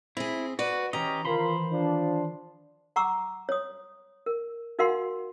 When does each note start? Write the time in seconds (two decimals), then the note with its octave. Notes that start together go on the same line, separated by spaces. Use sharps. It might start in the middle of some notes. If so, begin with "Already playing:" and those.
0.17 C4 E4 G#4
0.59 F#4 B4 D5
0.93 E3 C#4 E4 G4 D#5 A#5
1.25 D#3 E3 F4 A#4 C5 B5 C6
1.71 F3 D4
2.96 F#5 A#5 C#6 D6 E6
3.49 C#5 D#6
4.26 A#4
4.79 D#4 F#4 A#4 F5 F#5 C6